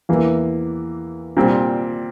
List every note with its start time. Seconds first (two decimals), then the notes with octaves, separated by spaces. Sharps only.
0.09 E2 E3 A#3
1.37 A#2 G3 C4